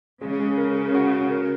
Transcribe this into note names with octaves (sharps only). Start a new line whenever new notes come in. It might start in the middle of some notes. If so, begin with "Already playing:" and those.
C#3 G#3
G#3
A#4
A#4
F#4
F#4
A#4